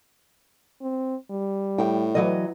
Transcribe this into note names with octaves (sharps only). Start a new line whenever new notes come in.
C4
G3
A2 G5
E3 F#3 D#5